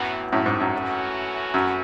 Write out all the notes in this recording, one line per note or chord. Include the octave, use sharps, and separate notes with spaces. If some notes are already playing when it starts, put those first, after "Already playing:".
Already playing: F#2 A2 E3 B3 F#4
F#2 A2
G#2
F#2
E3 A3 C#4 F#4
F#2